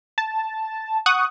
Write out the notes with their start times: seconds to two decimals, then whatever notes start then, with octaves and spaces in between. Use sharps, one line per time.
0.18 A5
1.06 F#5 C#6 D#6 F#6